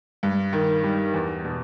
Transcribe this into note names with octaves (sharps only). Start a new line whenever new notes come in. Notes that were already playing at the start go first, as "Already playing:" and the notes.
G2
D#3
G3
E2
B2